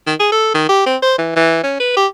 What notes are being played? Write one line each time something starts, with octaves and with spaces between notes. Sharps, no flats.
D#3
G#4
A4
D#3
G4
C4
C5
E3
E3
C#4
B4
G4